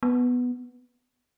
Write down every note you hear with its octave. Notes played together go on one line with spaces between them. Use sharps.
B3